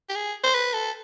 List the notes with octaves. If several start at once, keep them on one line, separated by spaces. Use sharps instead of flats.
G4
G#4
C5
B4
A4